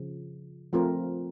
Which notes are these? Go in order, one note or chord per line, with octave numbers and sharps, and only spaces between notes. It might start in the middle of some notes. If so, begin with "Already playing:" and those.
Already playing: C#3 F3
F3 A3 C4 F4 A#4